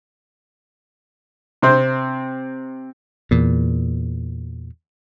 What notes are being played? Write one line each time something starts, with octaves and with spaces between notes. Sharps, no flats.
C3 C4
E2 A#2